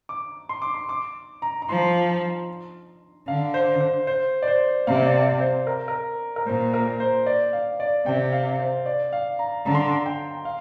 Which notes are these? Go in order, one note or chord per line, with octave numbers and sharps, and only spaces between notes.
D6
C6
D6
C6
D6
A#5
A#5
F3 C6
D3 F5
C5
C5
C5
D5
C5
C3 F5
D5
F5
C5
A#4
A#4
A#4
A#2 C5
A#4
C5
D5
F5
D5
C3 G5
F5
C5
D5
F5
A#5
D3 A#5
C6
A#5
G5
F5